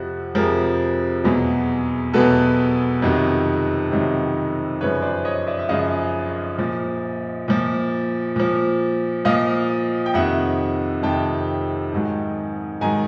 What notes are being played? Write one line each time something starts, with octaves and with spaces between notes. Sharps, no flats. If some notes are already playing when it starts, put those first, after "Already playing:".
Already playing: F2 C3 F3 F#4
F2 C3 F3 G#4 A#4
E2 B2 F#3
E2 B2 F#3 A4 B4
F2 C3 D#3 F#3
F2 C3 D#3 F#3
F#2 C#3 F3 B4 C#5
C5 D5
C#5 D#5
D5 E5
E5
F#2 C#3 F3 D#5 F5
A#2 F3
A#2 F3
A#2 F3
A#2 F3 D#5 F5
G5
F2 C3 D#3 E5 F#5
F2 C3 D#3 G5 A5
G#2 D#3 F#3
G#2 D#3 F#3 G#5 A#5